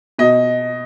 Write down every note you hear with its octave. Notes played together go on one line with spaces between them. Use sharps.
B2 D#5